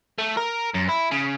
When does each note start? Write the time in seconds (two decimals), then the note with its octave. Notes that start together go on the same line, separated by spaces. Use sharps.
0.19 A3
0.37 A#4
0.74 F#2
0.89 E4
1.11 C#3